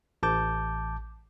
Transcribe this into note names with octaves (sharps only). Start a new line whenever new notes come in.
A1 A5 D6 G6